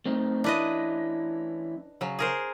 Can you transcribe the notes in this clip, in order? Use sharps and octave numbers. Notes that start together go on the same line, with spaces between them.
A3 C4 D#4
E3 C#4 D4 E4 B4 D#5
C#3 F#3
G#4 A#4 C5